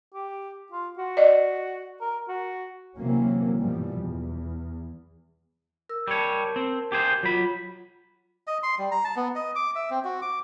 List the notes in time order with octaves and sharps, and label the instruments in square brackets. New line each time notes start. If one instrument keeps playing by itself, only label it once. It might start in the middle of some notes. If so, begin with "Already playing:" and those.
[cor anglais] G4
F4
F#4
[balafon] D5 D#5
[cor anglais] A#4
F#4
[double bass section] C3 E3 F#3 A#3 C#4
G2 B2 E3 F3 G3
E2
[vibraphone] A#4 E6
[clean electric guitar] G3 C#5 [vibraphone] A#4 A5
[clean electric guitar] C4
G4 G#4 C5
[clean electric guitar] F#3 B5 [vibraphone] F4
[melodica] D#5
C6
G3
A#5
A5
B3
D#5
D6
E5
C4
F#4
D6